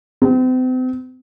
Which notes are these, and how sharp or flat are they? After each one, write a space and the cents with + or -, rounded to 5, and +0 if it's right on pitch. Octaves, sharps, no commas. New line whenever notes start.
C4 -40